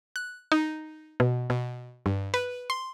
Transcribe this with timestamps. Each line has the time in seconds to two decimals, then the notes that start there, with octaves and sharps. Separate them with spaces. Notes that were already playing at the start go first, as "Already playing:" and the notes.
0.16 F#6
0.52 D#4
1.20 B2
1.50 B2
2.06 G2
2.34 B4
2.70 C6